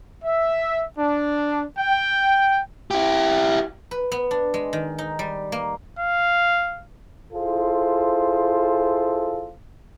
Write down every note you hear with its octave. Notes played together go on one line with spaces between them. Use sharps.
E5
D4
G5
E4 G4
B4
B3
D4
G#3
D#3
D#4
G3
A#3
F5
E4 F4 G#4 A4 C5